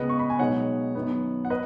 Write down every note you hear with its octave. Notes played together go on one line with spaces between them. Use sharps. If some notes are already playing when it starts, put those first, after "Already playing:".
Already playing: C#2 C#3 B3 B4 D#5
C#6
B5
G#5
B1 B2 G#3 D#4 C#5 F#5
F#2 D#3 B3
F#5
B4 D#5